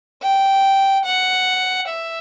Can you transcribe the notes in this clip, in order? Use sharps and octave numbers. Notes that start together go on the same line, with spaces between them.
G5
F#5
E5